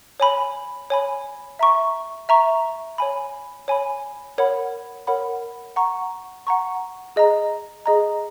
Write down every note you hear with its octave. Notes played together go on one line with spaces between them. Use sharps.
C#5 G#5 B5
C#5 G#5 B5
E5 A#5 C#6
E5 A#5 C#6
C#5 G#5 B5
C#5 G#5 B5
A#4 C#5 F#5 B5
A#4 C#5 F#5 B5
F#5 A#5 C#6
F#5 A#5 C#6
G#4 D#5 A#5
G#4 D#5 A#5